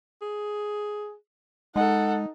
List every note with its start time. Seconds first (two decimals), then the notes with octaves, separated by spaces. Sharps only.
0.22 G#4
1.76 G#3 D#4 A4 F#5